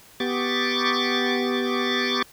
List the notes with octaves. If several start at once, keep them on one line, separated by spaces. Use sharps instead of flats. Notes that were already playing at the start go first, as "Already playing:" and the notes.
B3 G4 C#6 D6 A6